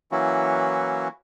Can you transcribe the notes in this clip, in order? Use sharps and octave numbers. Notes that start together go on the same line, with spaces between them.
E3 F#3 A#3 C#4 E4 F#4